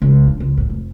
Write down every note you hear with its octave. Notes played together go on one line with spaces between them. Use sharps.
C#2
D3
C#2
A2
F1